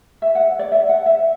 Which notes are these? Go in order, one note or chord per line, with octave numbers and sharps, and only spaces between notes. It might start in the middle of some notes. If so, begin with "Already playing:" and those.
E5
F#5
D5
E5
F#5
E5